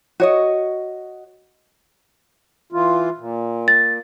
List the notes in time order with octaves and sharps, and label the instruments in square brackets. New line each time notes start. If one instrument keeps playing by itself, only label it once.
[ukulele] F#4 C#5 D#5
[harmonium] E3 F4
A#2
[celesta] A6